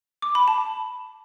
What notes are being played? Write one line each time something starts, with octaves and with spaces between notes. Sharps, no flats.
D6
B5
A5
B5